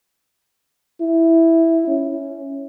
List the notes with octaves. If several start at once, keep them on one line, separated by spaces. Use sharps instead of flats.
E4
C#4